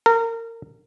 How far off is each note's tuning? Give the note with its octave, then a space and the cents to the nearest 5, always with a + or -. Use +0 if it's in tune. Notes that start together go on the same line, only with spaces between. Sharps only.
A#4 -25